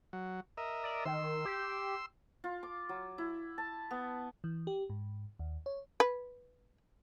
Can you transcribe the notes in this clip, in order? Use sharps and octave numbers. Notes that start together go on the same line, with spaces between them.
F#3
A#4 D#5 E5
D5
D#3 C6 E6
G4
F4
D6
F#3
E4
A5
B3
E3
G4
G#2
D#2
C#5
B4